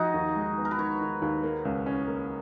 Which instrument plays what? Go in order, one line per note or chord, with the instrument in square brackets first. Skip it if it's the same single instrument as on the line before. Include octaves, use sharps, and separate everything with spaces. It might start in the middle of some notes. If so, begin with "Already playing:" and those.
Already playing: [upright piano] F3 [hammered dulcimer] D#4 F#4 G#4
[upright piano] D#2
G#3
B3
[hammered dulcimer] A#4
B4
[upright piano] D#3 [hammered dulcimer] C#5
[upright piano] D#3
D#2
A#3
C#2
C#4
A#3